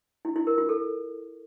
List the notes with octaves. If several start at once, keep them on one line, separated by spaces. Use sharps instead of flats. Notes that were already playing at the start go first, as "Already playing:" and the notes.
E4
E4
A#4
F4
A4